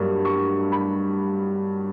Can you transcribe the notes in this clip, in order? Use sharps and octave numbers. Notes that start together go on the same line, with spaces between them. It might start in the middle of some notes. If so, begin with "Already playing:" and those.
Already playing: G2 F#3 A#3 C#6
C#6
B5